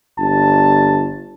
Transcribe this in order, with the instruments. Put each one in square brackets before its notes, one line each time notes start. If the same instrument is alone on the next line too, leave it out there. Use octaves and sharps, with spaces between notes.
[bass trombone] G1 [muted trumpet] A5